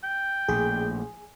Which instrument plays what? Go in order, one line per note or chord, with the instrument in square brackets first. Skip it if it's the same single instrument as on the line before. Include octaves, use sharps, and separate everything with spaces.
[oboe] G5
[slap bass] A#1 A2 [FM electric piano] G#4